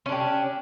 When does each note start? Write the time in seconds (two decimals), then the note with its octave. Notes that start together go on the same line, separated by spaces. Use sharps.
0.06 C#4
0.09 D4
0.12 G4